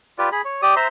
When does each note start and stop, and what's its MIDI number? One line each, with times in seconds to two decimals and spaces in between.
0.18 0.29 65
0.18 0.29 67
0.18 0.29 71
0.18 0.29 74
0.32 0.42 68
0.32 0.42 83
0.45 0.61 73
0.62 0.75 67
0.62 0.75 74
0.62 0.75 87
0.76 0.87 72
0.76 0.87 76
0.76 0.87 82
0.76 0.87 84